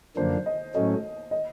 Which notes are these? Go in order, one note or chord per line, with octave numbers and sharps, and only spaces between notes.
F#2 D3 F3 A#3 D4 C5
D#5
A2 F#3 A3 C#4 D#5
D#5